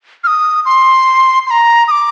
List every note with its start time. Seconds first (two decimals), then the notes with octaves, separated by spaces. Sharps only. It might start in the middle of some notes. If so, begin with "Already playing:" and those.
0.24 F6
0.27 D#6
0.66 C6
1.47 C6
1.51 A#5
1.88 D#6
1.91 D6